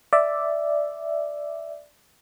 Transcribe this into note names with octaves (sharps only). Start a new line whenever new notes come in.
D5 E5